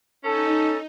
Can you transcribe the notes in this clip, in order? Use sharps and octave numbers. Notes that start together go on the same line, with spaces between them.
C#4 D#4 A4